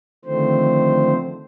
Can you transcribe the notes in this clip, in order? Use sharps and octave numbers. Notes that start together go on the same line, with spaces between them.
D3 D#3 F3 A3 C4 C5